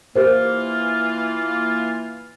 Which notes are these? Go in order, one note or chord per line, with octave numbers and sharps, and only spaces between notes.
E3 A#3 F4 G4 A#4 C5